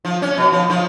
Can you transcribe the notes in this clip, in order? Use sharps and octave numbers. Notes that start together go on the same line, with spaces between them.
F3
C#4
B2
F3
F3